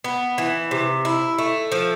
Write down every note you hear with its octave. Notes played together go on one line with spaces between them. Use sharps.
B3
E3
C3
E4
A3
F3